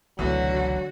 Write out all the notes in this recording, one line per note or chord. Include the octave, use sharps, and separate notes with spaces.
G1 C#2 B2 D3 E3 F#3 A3 F#4